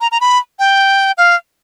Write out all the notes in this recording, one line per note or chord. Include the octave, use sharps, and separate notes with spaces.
A#5
A#5
B5
G5
F5